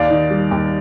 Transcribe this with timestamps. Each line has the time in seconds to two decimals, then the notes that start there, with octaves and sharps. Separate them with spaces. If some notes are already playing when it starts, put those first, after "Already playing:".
Already playing: D#2 D5 F5
0.10 D#3
0.30 G3
0.51 D#2